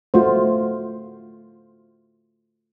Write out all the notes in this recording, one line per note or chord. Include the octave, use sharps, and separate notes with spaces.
A3 F4 F#4 C5